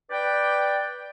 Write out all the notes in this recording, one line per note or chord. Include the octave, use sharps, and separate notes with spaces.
B4 D5 G5